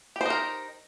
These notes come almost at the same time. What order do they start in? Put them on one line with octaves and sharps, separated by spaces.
G4 C5 D#4 A#4